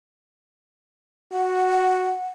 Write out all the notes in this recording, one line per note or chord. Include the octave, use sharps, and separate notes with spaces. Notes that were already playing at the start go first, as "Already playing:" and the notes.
F#4 F#5